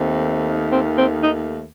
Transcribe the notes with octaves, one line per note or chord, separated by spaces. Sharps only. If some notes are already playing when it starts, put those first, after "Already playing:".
Already playing: D#2 D#3 A3 C4
C4
C4
D#4